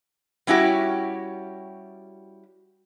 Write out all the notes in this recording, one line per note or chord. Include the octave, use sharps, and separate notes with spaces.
G3 C#4 E4 F#4 G4